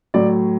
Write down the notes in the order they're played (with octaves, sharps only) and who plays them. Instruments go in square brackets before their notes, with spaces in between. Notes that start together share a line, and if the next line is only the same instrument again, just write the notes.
[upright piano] A2 F#3 D5